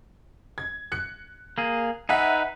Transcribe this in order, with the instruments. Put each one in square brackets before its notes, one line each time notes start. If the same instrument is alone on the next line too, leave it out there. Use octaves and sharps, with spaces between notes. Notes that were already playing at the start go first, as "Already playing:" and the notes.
[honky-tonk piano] G#6
F#6 C#7
[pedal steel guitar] A#3 G#4
[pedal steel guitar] D#4 B4 [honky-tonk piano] E5 F#5 G#5